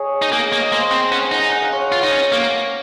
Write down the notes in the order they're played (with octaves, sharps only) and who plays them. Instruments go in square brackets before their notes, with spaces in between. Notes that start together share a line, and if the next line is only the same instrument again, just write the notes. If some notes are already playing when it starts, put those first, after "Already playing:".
Already playing: [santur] G#4 C#5 D#5
[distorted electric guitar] D#4
[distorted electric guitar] A#3 [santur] G#4
[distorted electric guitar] A#3 [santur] D#5
[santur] D#5
[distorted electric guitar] A#3 [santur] C5
[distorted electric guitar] C4
[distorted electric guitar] C#4 [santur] F#5
[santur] A#5
[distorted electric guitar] D#4 [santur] F#5
[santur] G#5
F#5
F5
C#5
F#5
[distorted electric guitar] F4
D#4
C#4
[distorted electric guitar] A#3 [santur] F5